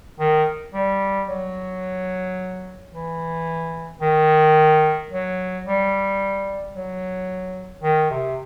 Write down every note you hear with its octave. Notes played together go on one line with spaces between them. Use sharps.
D#3
G3
F#3
E3
D#3
F#3
G3
F#3
D#3
C3